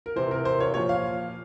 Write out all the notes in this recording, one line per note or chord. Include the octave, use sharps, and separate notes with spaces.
A#4
C3 E3 C5
A#4
C5
C#5
A#2 F3 C#5
F5